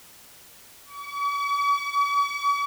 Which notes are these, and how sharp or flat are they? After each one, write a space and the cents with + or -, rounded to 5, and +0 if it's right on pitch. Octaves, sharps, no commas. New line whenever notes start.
C#6 +45